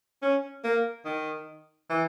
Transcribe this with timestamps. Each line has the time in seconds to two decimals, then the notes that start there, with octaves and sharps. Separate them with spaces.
0.23 C#4
0.64 A#3
1.05 D#3
1.90 E3